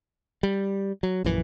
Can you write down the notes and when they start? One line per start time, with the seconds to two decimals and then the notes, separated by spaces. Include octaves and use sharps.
0.43 G3
1.03 F#3
1.25 A#1 F#2 E3